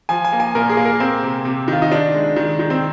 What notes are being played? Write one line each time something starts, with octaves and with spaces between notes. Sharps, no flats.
F3 G#5
G#5
A#3
G#5
A#2 A#4
G#4
A#3
A#4
A#3 C4
C3
C3
D#3 F4
D#4
D#3 D4
G#3
D#3
D#3
C4